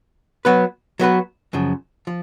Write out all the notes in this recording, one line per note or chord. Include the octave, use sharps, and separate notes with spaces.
F#3 B3 F#4 B4
F#3 B3 F#4 B4
F#2 C#3 F3
F3